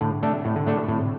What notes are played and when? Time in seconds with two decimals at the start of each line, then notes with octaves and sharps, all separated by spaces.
0.01 A2 D3
0.22 C3 A3 D4 A4
0.44 A2 C3
0.56 D3
0.66 A2 A3 D4 A4
0.77 A2
0.88 A2 C3